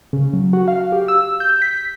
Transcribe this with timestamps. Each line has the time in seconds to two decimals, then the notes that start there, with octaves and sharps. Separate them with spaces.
0.13 C#3
0.33 F#3
0.53 F#4
0.68 F5
0.92 G4
1.08 E6
1.40 G6
1.62 B6